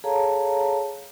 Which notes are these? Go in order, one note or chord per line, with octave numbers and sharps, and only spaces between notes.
G#4 A4 C#5 F5 A5 A#5